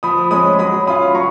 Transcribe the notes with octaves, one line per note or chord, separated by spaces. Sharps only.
F3 B5 D#6
G#3 C#4 B5 D#6
F#3 B5 D#6
C#4 F4 B5 D#6
F#3 A#5 C#6